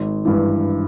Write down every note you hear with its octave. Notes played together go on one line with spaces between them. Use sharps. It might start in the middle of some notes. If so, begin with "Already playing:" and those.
Already playing: G#1
G2 E3